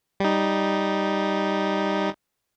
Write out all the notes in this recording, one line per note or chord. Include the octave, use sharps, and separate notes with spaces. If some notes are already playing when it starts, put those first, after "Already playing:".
G3 D#4